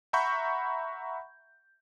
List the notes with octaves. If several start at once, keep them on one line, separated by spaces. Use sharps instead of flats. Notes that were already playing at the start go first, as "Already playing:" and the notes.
E5 F#5 A#5 B5 C#6 G6